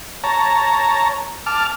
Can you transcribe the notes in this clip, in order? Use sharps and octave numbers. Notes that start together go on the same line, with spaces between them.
C#5 A5 A#5
A5 D6 F6